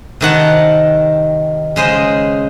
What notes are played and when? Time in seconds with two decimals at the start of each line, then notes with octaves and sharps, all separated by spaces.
0.21 C3 D#3 F#5 A5
1.76 C#3 G#3 C5 D#5